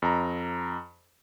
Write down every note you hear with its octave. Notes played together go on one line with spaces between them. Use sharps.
F2 A#5